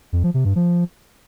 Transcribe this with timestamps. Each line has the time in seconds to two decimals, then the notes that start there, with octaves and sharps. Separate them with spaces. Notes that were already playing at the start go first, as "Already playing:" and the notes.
0.13 F2
0.23 F3
0.34 C3
0.45 G2
0.56 F3